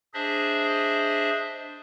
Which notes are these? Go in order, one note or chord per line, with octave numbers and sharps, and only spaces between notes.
D4 G#4 C5 D#5 E5